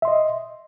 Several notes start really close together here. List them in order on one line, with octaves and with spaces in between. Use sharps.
E5 C6 D#5